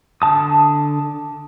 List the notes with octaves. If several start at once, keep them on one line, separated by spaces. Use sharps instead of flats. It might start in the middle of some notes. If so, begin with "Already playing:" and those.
D3 A5 D#6